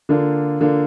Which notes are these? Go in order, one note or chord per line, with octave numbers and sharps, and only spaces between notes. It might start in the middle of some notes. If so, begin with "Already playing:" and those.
D3 A#3 D4 F4
D3 A#3 D4 F4